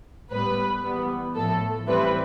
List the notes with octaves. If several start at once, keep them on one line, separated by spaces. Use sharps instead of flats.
A2 G3 B3 B4
E3 G3 B3
A2 F3 A3 A4
A2 E3 G3 C4 E4 B4